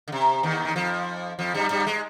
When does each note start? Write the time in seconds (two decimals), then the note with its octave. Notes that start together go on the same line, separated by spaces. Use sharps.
0.08 D3
0.12 C3
0.43 D#2 D#3
0.65 D#3
0.76 F2 F3
1.39 F2 F3
1.54 G2 G3
1.71 G2 G3
1.87 G#3